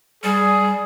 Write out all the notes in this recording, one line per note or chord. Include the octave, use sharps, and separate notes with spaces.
G3 G#4